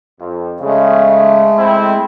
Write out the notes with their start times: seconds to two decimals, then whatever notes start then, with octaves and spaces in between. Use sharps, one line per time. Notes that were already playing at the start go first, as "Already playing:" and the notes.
0.20 F2
0.60 C#3 G#3 A3
1.59 C4 E4